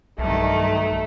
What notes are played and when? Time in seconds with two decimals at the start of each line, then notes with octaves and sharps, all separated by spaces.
0.19 B1 G2 D#3 A3